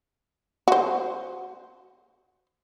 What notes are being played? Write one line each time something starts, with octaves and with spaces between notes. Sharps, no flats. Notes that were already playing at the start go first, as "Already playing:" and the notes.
F#4 C5